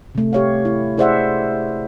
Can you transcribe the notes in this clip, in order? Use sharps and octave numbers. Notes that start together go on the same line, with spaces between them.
C3 A3
G4 C#5 F5
E4
E4 G#4 C5 D5 E5 F#5